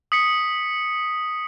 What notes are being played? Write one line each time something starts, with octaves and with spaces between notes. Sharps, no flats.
D#6 B6 C#7